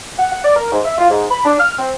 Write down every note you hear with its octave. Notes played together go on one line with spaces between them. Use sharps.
F#5
F#5
D5
A#4
G#2
E5
F4
G#2
B5
D4
F6
C4